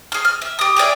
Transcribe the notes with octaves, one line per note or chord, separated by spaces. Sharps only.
G#4 F6
F6
E5
G4 D#6
G4 G#4 D5 E5